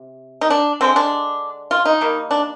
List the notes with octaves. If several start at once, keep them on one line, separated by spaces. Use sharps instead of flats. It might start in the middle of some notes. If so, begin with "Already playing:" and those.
Already playing: C3
D#4
D4
D3 G#3 C4
D4
F4
D#4
D#3 G3 A#3
D4